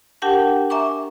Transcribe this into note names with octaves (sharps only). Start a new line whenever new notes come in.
D4 G4 A#4 F#5 G5 A5
E5 G#5 A#5 C#6 D6